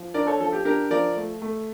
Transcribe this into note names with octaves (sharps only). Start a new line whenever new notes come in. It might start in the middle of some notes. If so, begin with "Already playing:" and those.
Already playing: F3
D4 A#4 D5
A4 C#5
F3 A4
G4
D4 G4 A#4
F3 A#4 D5
A3
A3